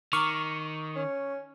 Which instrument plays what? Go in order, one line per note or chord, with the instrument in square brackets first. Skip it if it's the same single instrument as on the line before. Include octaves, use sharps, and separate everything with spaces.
[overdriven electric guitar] D#3 [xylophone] A#5 D6 F6 [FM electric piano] C#6
[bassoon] C#4